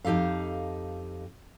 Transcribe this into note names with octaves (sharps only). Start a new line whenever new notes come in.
F2 D#4 G4 A4 F5